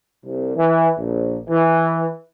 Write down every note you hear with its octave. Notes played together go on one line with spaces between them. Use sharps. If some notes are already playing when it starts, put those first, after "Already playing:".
C2
E3
A#1
E3